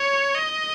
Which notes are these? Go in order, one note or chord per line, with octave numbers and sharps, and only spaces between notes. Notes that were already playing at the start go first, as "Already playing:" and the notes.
Already playing: C#5
D#5